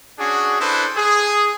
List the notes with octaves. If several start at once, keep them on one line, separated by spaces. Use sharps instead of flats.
C#4 D4 F#4 G#4
D4 E4 A4 B4 C5
G#4